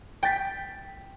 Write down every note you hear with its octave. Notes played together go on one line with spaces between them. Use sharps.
G5 G6 A6 B6